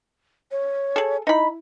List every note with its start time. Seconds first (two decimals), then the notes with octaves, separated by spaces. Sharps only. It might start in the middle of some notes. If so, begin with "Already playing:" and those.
0.51 C#5
0.96 G#4 A4
1.27 D#4 E4 B5